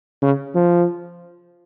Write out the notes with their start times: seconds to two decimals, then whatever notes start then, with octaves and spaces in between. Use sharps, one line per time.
0.22 C#3
0.55 F3